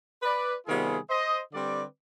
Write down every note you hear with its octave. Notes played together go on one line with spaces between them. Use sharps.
B4 D5
C3 D#3 G3 B3 F4 G#4
C5 D#5
D3 G3 C4 B4 D5